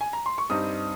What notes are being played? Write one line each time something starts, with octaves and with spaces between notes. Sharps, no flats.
G#5
A#5
C6
C#6
G2 G3 C4 D#4 D#6